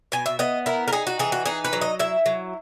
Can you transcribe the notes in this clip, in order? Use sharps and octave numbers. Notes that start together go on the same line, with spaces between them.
B2 G#5
E5
B3 D#5
E4 A#4
A#4
D#4 G#4
F#4
E3 G#4
F#4
D#4 G#4
B4
F#3
D#5
E4 E5
F#3